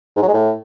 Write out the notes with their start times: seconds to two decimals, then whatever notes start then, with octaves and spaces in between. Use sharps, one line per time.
0.16 G#2
0.22 F#3
0.28 G#3
0.34 A2